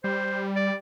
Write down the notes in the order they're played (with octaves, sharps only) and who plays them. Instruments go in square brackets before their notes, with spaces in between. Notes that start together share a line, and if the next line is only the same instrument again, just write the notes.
[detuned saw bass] G3 [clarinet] C5
[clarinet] D5